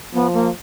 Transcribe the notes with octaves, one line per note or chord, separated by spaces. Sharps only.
F3 B3
A#3